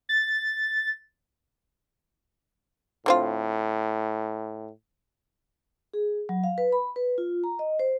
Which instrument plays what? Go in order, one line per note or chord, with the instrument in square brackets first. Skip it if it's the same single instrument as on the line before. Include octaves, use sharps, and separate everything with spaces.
[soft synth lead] A6
[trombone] A2 [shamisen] D3 C4 F4
[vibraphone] G#4
F#3
F5
B4
B5
B4
F4
A#5
D#5
C5